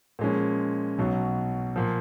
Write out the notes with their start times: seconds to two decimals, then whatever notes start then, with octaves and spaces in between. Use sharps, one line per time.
0.19 A#2 F3 G#3 C#4
0.98 B1 B2 F#3
1.76 A#2 F3